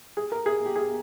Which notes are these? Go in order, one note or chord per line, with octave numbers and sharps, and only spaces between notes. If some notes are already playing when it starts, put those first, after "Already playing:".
G#4
A#4
G#4
G4
G#4